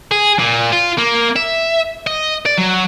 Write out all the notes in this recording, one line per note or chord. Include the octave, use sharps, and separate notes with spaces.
G#4
A#2
F4
A#3
E5
D#5
D5
F#3